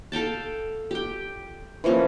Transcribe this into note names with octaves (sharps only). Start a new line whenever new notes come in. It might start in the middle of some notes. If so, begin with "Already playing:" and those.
A4 F5 G5 A5
G4 G5
E3 F3 A#3 C#4